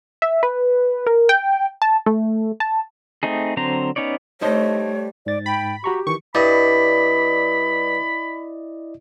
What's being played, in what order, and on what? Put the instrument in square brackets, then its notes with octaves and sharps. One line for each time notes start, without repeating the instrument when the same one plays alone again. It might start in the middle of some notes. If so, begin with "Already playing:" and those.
[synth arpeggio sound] E5
B4
A#4
G5
A5
A3
A5
[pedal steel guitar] A3 C4 D#4 G#4
D3 F#3 C4 C5 A#5
B3 C#4 D#4 C#5 D5
[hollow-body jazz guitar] G3 C5 [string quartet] A3 [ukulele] D#4 D#5 A5 [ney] C#5
[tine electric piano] G#2 A6 [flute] D5
[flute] G5 [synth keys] B5
[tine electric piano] F#4 A#5 C#6 [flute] G4
[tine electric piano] D#3 E3 [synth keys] C#6
[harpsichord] G2 [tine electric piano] E4 D5 D#5 [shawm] B5